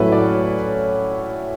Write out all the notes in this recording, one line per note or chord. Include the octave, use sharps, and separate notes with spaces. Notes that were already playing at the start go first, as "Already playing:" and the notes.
Already playing: A2 F#3 C#4 E4 A4 B4
D5